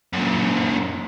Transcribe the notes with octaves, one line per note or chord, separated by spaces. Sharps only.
F#2 A#2